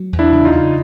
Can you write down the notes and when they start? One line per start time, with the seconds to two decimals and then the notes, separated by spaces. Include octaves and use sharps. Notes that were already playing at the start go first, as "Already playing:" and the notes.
Already playing: F#3
0.13 E2
0.19 D4 E4
0.32 C#3
0.45 D#4 F4
0.52 C#3